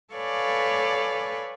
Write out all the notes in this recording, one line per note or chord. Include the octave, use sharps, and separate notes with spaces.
A4 B4 C#5 D5 F5 G#5